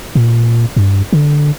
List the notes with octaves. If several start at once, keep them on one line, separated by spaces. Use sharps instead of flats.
A#2
G2
D3